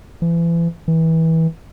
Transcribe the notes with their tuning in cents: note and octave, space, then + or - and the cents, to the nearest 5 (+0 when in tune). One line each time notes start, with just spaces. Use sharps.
E3 +35
E3 -25